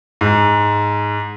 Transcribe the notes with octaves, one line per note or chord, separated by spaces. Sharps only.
G#2